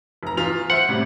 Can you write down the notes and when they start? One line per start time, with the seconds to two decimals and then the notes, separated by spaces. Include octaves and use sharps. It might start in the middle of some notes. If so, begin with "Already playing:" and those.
0.23 F1 A#5
0.37 E2 F4 F7
0.70 C5 E5 F#5
0.89 A2 C3 G3